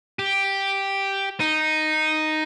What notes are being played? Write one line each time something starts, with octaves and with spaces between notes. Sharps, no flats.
G4
D#4